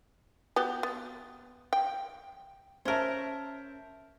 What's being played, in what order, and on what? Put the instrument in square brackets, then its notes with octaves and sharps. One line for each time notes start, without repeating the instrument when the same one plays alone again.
[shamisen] B3 F#4 G4
B3
G5
[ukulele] C#4 A#4 [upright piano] C5 E5 A5